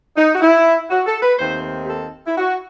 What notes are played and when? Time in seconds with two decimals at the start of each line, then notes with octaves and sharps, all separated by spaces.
0.17 D#4
0.35 F#4
0.41 E4
0.90 F#4
1.07 A4
1.22 B4
1.39 D#2 D#3 A3 C4 C5
1.85 G4
1.88 A4
2.27 E4
2.37 F#4